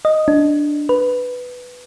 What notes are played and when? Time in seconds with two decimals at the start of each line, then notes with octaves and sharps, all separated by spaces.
0.05 D#5
0.28 D4
0.89 B4